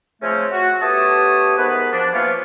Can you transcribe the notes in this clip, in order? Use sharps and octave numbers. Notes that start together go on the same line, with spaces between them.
C#3 F3 A3 C4 C#4
F#4
A3 B3 G4 C#5 A5 D#6
G#2 D#3 B3 B4
F3 D4
E3 F3 A#3 B3 C#4 F4